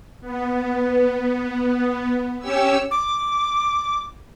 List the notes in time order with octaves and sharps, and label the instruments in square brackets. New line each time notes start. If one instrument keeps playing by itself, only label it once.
[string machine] B3
C#4 G4 C#5 E6
[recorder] D6